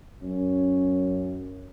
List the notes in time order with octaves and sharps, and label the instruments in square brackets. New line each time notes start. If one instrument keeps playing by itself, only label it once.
[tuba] F#2 [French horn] C#4